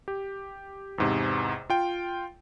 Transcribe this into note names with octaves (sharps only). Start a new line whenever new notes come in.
G4
E2 G#2 C3
F4 G5